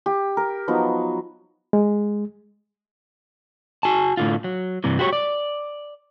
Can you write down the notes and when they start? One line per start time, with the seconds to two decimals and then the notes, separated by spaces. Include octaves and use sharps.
0.06 G4
0.37 A#4
0.68 F3 F#3 B3 D#4
1.73 G#3
3.83 F#4 G#5 A5
4.17 A2 D3 F4
4.44 F#3
4.84 G2 C3 E3
4.99 F#4 G4 C5 C#5
5.13 D5